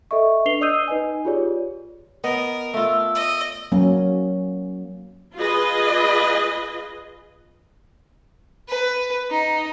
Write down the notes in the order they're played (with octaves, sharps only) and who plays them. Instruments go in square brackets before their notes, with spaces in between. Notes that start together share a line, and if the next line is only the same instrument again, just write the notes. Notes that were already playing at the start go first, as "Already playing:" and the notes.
[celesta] A4 D#5 E5 C#6
D4 B4 C7 F7 G7
D5 D#5 D#6 E6 G6 D#7
D#4 B4 D#5 G#5
F4 G4 G#4 C#5 D5
[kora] B3 D#5 F#5 [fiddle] A#4
[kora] A3 F4 [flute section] E6
[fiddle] D#5
[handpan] F#3 A#3 C#4
[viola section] F4 G#4 B4 D#5
[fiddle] B4
D#4